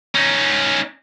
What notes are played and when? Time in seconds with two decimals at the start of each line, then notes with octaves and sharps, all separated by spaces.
0.15 C#4 D#4